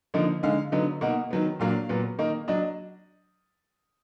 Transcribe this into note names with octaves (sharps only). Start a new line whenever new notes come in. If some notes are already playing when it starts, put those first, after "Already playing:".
D3 F3 A#3 D#4
D3 G#3 D#4 F5
D3 F#3 B3 D#4
B2 A#3 D#4 F#5
D#3 F#3 B3
A#2 F#3 A#3 D4 F5
A#2 F#3 B3
D#3 A#3 D#4
F#3 D4 D#5